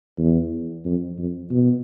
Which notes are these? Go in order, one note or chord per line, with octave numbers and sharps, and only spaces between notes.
E2
F2
F2
B2